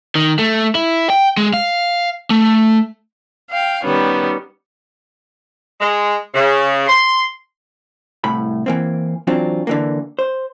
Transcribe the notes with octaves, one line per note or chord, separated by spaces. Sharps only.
D#3
A3
E4
G5
G#3
F5
A3
F5 G5
D#3 G3 B3 C#4
G#3
C#3
C6
C2 A2 B5
E3 A#3 C4
E3 F#3 C4 D4 F4
D3 E3 A#3
C5